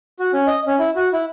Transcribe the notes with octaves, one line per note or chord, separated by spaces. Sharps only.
F#4
C#4
D#5
C#4
E4
F#4
E4